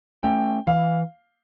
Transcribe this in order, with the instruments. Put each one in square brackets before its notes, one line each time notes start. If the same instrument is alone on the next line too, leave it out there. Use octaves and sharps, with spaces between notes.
[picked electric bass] A3 C#4 [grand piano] G5
[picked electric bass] E3 [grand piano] F5